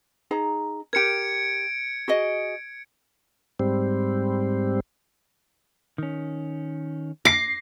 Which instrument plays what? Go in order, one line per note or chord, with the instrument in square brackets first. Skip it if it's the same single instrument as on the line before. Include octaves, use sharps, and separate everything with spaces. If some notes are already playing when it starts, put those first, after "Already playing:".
[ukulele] D#4 G#4 A#5
[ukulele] G4 A#4 [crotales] G#6 C#7 D7
[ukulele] F#4 G#4 D#5
[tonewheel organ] G#2 G3 C4
[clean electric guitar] D#3 C#4
[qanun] D6 [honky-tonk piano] A#6 C7